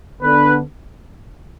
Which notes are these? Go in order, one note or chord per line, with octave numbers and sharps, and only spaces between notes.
D3 B3 D4 B4